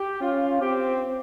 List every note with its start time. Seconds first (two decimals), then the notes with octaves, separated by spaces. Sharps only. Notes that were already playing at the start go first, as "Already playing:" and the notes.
Already playing: G4
0.21 C#4 F4
0.61 C4 G4